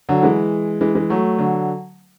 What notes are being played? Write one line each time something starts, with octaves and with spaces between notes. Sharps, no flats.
D3 F#3
E3 G#3
E3 G#3
E3 G#3
F#3 A3
D3 F#3